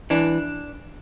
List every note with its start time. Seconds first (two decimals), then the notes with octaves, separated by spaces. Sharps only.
0.10 E3 D4